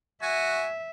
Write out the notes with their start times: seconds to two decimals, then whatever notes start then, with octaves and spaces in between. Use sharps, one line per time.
0.22 F#4 E5 G#5